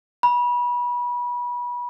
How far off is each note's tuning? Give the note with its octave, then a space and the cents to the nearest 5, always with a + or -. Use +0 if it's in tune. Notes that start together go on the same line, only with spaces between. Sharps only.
B5 -25